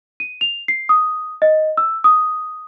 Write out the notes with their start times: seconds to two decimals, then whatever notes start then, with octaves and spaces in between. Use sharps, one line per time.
0.20 D#7
0.41 F7
0.68 C7
0.89 D#6
1.42 D#5
1.77 E6
2.04 D#6